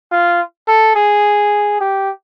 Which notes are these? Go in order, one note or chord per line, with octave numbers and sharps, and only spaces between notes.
F4
A4
G#4
G4